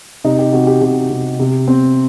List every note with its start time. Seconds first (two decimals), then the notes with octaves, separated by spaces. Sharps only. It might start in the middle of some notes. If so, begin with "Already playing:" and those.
0.24 C3 D#4
0.39 G4
0.53 C3 F#4
0.67 G4
0.82 C3 G4
1.10 C3
1.39 C3
1.68 C4